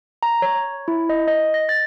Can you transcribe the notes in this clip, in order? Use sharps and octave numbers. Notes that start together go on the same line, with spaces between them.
A#5
C#5
E4
D#5
D#5
A#6
A6